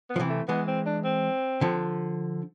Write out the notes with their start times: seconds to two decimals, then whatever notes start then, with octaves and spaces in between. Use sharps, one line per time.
0.10 B3
0.16 F3
0.20 C3 E3
0.29 A3
0.48 E3 G#3 B3
0.67 C4
0.86 D4
1.04 C4
1.61 D3 F3